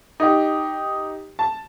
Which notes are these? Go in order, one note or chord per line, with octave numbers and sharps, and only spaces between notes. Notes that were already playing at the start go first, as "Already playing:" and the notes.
D#4 G4
A5